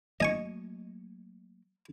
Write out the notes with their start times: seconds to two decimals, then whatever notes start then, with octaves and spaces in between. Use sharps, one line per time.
0.20 F#3 A3 A#3 D#5 G#5 C#6